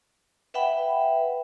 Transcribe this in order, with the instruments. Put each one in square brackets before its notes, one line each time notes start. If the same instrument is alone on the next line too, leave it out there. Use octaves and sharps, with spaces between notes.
[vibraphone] B4 E5 F#5 G5 B5